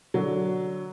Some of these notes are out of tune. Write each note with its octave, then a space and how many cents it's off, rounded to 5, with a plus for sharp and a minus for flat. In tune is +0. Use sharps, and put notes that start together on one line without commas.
D3 +0 F#3 +0